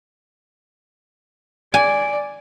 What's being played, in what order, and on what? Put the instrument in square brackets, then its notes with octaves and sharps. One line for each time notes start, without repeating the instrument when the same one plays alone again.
[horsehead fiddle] D5 [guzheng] G#5